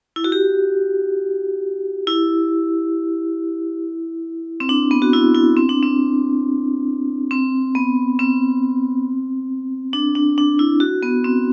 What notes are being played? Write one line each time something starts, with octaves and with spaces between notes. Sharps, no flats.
E4
F#4
G4
E4
C4
D4
B3
F#4
E4
E4
C4
D4
C4
C4
B3
C4
D4
D4
D4
E4
F#4
B3
C4